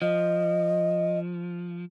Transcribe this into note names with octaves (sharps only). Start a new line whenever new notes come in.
F3 D#5